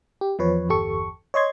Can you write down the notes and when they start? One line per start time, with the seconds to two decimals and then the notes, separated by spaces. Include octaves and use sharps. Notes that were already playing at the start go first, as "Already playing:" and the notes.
0.21 G4
0.39 E2 F3 B4 C#5
0.69 G1 E2 G4 A4 C#6
1.34 C#5 D#5 C6 G#6